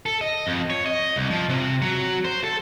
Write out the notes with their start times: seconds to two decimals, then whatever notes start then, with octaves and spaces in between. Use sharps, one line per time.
0.06 A4
0.21 D#5
0.47 F2
0.70 C#5
0.86 D#5
1.16 C2
1.30 F3
1.49 C3
1.82 F#3
2.25 C5
2.44 A4